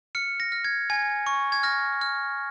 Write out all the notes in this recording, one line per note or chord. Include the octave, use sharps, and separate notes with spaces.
F6 C#7
A#6
F6
G#6
G#5 G#6
C#6
G#6
F6 A#6
F6